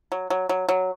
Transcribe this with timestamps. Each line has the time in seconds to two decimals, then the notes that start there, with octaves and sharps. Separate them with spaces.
0.12 F#3
0.30 F#3
0.49 F#3
0.69 F#3